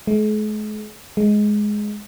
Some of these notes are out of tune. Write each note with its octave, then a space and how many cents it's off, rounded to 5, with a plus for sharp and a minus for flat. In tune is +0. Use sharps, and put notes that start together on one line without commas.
G#3 +45
G#3 +10